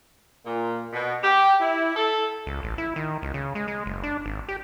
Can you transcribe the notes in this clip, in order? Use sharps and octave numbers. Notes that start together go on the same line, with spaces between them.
A#2
B2
G4
E4
A4
C#2
A1
E4
D#3
C#2
C#3
G#3
G#3
F#1
D4
G#1
G4